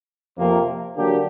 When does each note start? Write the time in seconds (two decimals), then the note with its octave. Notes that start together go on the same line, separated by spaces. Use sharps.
0.36 F2 C3 F3 A#3
0.96 D3 F#3 A#3 D4 G4